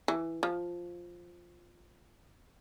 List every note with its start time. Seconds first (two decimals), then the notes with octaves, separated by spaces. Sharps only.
0.08 E3
0.43 F3